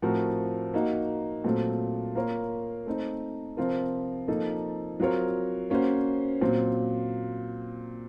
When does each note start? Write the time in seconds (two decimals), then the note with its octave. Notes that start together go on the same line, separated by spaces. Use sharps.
0.02 A2 F3 C4 F#4 A#4
0.74 A#3 D#4 F#4
1.44 A#2 F#3 A3 C4
2.15 A#3 F4 A#4 C#5
2.86 A3 C4 D#4
3.57 C3 F3 C4 F4 A#4
4.28 F3 A#3 D#4 A4
5.00 F#3 C4 F4 A#4 C#5
5.70 A#3 C#4 F#4 C5
6.41 A#2 F#3 C4